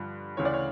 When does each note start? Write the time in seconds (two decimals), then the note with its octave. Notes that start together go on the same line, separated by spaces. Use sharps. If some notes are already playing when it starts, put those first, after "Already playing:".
Already playing: G2 D3 F3
0.37 D2 C#3 E3 C#5
0.45 D5
0.54 C#5